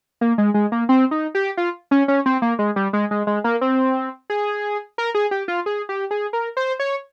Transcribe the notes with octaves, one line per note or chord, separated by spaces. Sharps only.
A#3
G#3
G#3
A#3
C4
D#4
G4
F4
C#4
C#4
C4
A#3
G#3
G3
G#3
G#3
G#3
A#3
C4
G#4
A#4
G#4
G4
F4
G#4
G4
G#4
A#4
C5
C#5